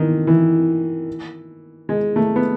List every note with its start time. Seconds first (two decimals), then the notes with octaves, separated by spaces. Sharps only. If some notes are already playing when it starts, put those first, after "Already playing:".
Already playing: D#3 E3
0.27 E3
1.89 G#3
2.16 A3
2.36 B3